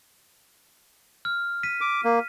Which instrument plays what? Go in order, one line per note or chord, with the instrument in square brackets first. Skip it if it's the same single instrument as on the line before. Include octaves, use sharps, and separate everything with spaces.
[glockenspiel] F6
B6 D#7
[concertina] D6
A#3